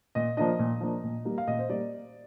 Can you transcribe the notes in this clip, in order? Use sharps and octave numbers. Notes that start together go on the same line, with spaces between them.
A#2 D#5
F3 A#3 D4 D#5
A#2
F3 A#3 D4
A#2
G3 A#3
F5
A#2 D#5
C5
G3 A#3 D5